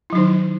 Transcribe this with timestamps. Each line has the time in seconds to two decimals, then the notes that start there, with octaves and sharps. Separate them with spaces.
0.10 E4
0.13 F#3
0.15 D#4
0.18 D#3